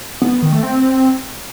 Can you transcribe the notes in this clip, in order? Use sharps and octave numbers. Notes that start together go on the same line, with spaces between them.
B3
B3
D#3
A3
C4